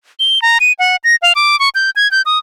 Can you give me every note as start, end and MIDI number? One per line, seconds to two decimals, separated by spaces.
0.20 0.41 103
0.42 0.58 82
0.60 0.73 99
0.79 0.96 78
1.04 1.16 94
1.22 1.33 77
1.35 1.58 86
1.60 1.69 85
1.75 1.90 91
1.96 2.10 92
2.11 2.22 91
2.26 2.39 87